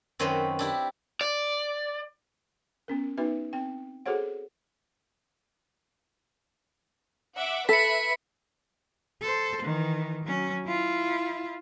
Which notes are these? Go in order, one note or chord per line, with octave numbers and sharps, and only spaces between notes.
F#2 D#3 C4 F#4 B4 C6
D4 E4 G4
D5
B3 C#4 A#4
B3 D#4 F#4 B4 E5
C4 G5
F#4 G#4 A4 C5 C#5 F#5
E5 F#5 D6
A4 B4 E5 B5 B6 C#7
A4 C5
D#3 E3
F#3 C#4
E4 F4